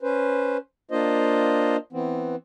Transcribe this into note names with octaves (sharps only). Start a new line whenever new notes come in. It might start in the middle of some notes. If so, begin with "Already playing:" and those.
C#4 B4 C5
A#3 D4 F4 C5 D#5
E3 B3 C4